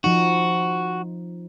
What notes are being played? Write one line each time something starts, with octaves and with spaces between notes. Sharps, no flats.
F3 D#4 F#4